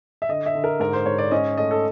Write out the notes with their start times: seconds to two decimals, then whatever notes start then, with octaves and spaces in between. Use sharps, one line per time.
0.22 E5
0.29 D3 D#5
0.46 E5
0.55 D3
0.64 A#4
0.80 G#2 A#4
0.93 C5
1.06 G#2 C#5
1.18 D5
1.31 C#4 D#5
1.57 A3 D#5
1.71 A4